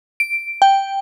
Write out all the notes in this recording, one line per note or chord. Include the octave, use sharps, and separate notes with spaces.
D7
G5